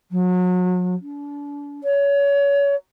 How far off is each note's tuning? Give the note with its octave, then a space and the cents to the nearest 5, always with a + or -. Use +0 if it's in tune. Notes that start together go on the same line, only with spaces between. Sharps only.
F#3 -35
D4 -35
C#5 +25